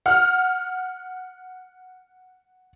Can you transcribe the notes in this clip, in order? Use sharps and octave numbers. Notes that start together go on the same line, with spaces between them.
F#5 F6